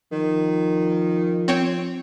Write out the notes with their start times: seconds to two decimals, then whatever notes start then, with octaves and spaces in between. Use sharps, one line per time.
0.12 D#3 F3
1.48 C4 C#5 G5